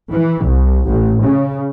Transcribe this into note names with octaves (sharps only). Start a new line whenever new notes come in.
E3
C2
A1
C#3